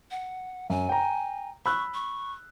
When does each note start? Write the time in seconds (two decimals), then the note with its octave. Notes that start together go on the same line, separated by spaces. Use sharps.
0.11 F#5
0.70 F#2 G#5
0.89 G5 A#5
1.66 B5 C#6 E6 F#6
1.94 C#6